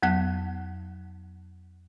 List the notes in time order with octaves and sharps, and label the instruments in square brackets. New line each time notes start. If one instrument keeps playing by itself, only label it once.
[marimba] F2 F#3 B3 F#5 F#6